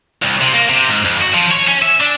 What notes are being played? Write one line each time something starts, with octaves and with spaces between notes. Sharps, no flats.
C2
C3
A#3
C3
G#2
F2
F#4
F3
C#5
C#4
E5
D4